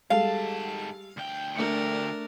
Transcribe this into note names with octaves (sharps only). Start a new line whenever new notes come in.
G#2 G3 G#3 A4 F5 A5
D2 G5
A3 D4 A#4 C#7